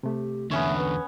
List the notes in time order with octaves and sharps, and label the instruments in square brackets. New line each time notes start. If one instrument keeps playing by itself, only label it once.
[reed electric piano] C3 A3 [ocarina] G4
[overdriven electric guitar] E2 D3 [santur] B3 C#4 C#5 [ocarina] E5
[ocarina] B4